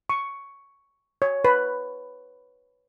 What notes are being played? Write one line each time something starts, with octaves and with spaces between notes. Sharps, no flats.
C#6
C#5
B4